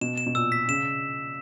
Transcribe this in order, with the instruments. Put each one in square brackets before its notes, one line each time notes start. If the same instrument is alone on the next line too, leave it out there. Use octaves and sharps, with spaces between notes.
[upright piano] B2 [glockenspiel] E7
[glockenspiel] E7
[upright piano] B2
[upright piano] A#2 [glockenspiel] E6
[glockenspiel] B6
[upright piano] C#3 [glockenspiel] E7